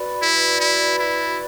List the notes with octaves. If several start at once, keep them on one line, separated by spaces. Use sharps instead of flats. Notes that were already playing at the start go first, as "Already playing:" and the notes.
Already playing: F#4 B4 D5 B5
E4
E4
E4